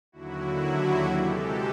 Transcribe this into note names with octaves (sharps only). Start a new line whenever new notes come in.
D#2 D3 F#3 E4 F#4
C3 E3 G#3 G4 A4